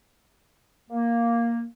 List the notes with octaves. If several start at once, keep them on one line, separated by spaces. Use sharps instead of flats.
A#3